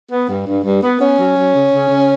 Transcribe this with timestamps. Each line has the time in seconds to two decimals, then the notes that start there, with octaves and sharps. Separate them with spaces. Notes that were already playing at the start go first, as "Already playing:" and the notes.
0.12 B3
0.29 G2
0.47 G2
0.64 G2
0.83 B3
1.00 B3 C#4
1.18 F#3
1.37 F#3
1.54 C#3
1.72 C#3
1.89 C#3